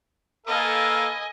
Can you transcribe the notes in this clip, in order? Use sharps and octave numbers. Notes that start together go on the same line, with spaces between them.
A#3 A4 B4 D#5 F5 G#5